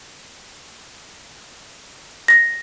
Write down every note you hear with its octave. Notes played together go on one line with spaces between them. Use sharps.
A#6